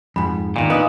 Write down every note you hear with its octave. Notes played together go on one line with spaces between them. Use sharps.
F2 G#2 B5
E2 A#2 D#3
D#4 B4 F5 D#6